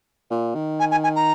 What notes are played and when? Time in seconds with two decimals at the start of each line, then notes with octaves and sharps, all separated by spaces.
0.30 A#2
0.55 D#3
0.79 G#5
0.91 G#5
1.03 G#5
1.15 A#5